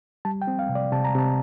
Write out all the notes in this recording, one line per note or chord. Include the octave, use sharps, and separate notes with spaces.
G3 A5
G5
C4
F5
C3
D5
C3 A5
A#5
C3 A5